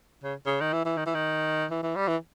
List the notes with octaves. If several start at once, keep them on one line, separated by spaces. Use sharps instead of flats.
C#3
C#3
D#3
E3
E3
D#3
E3
D#3
E3
E3
G3
E3